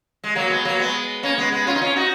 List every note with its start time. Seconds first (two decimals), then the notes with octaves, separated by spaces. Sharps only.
0.24 G#3
0.35 F#3 A#3
0.50 G#3 B3
0.65 F#3 A#3
0.79 G#3 B3
1.23 A#3 C#4
1.38 G#3 B3
1.52 G#3 B3
1.67 C#4 F4
1.75 D#4
1.82 C#4 F4
1.96 D#4 F#4